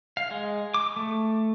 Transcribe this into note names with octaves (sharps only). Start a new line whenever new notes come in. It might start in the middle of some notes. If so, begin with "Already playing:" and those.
F5
G#3
D6
A3